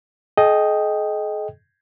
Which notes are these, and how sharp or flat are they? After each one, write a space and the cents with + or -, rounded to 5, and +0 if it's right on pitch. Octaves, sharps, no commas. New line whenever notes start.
G#4 +45 D#5 +0 G5 +0